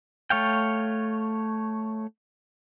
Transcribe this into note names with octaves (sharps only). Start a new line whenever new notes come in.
A3 C#5 F5 G5